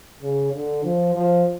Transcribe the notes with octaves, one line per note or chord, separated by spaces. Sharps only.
C#3
D3
F3
F3